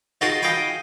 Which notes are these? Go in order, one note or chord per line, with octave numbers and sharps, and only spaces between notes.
D#4 F4 F#4 G#4 A#4 A5
D#5 F5 G5 G#5 B5